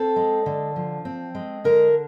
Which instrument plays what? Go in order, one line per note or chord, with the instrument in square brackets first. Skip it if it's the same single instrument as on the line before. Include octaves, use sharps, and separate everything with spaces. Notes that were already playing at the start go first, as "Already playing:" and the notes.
Already playing: [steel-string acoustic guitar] C4 A4
G#3
D3
F3
C4
G#3
D3 A#4